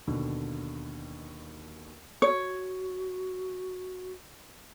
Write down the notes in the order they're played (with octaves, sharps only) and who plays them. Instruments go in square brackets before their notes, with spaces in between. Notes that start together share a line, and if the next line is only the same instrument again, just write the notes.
[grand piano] D#2 B2 D3
[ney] F#4 [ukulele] C#5